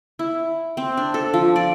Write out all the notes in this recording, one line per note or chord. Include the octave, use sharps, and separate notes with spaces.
E4
C4
D4
A4
F3
D5